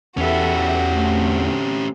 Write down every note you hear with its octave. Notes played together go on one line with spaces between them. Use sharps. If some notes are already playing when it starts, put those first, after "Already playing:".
E2 C#4 F#4 G4 A4 B4 E5
D3 A3 C4